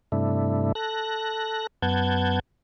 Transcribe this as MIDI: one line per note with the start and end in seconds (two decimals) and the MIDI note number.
0.12 0.72 43
0.12 0.72 48
0.12 0.72 57
0.12 0.72 62
0.12 0.72 64
0.75 1.67 69
0.75 1.67 90
0.75 1.67 94
1.82 2.39 42
1.82 2.39 59
1.82 2.39 78
1.82 2.39 81
1.82 2.39 91
1.82 2.39 92